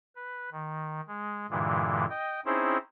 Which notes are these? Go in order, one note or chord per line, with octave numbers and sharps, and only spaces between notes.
B4
D#3
G#3
G2 A#2 D3 E3 G#3
D#5 G5
C4 C#4 D#4 E4 G#4 C5